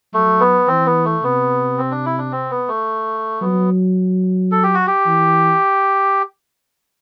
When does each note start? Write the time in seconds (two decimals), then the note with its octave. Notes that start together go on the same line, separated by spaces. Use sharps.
0.13 F#3 A3
0.40 B3
0.68 E3 C4
0.86 B3
1.05 A3
1.23 C3 B3
1.78 C4
1.91 D4
2.05 E4
2.18 D4
2.32 C4
2.50 B3
2.68 A3
3.41 F#3 B3
4.51 A4
4.63 G4
4.75 F#4
4.87 G4
5.06 E3